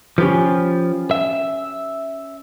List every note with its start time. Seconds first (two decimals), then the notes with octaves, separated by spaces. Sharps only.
0.18 F3 C#4 G4 B4
1.11 E5